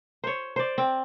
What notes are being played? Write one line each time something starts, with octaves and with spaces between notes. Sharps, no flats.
C5 C#5
C5 D5
C4